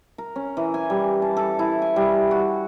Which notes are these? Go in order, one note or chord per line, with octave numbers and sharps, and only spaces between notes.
A#4
C#4
E3
G#5
G3
A5
A4
E4
G#5
G3
F#4